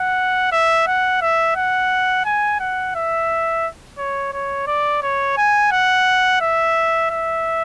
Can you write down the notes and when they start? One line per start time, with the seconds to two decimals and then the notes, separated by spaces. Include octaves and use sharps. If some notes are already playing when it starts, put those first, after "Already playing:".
Already playing: F#5
0.52 E5
0.87 F#5
1.21 E5
1.56 F#5
2.25 G#5
2.60 F#5
2.95 E5
3.98 C#5
4.33 C#5
4.67 D5
5.02 C#5
5.37 G#5
5.71 F#5
6.41 E5
7.10 E5